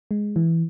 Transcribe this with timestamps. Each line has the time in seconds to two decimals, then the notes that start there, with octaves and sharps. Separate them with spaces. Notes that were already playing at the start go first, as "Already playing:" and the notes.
0.11 G#3
0.36 E3